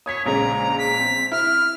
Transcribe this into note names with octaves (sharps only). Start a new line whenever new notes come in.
C#5 D#6 G#6 B6
A#1 C#3 G#3 A#5
B6
C4
E4 F6